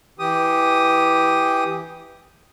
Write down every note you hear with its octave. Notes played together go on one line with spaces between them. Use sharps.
E3 G4 D#6